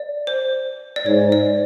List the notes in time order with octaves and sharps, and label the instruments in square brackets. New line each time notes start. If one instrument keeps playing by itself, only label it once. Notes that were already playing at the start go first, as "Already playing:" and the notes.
Already playing: [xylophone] D5
C5
D5
[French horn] G#2 [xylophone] C#5
[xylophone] D5